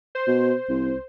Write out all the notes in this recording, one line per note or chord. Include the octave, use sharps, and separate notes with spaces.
C5
B2
C2